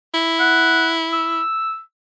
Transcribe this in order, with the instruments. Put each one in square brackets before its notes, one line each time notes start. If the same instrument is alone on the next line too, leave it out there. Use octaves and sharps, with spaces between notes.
[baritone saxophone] E4
[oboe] F#5
E6